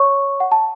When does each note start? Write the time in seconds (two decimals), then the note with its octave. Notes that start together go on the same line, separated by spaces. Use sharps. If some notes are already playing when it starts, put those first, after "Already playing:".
Already playing: C#5 C#6
0.40 F#5
0.52 A5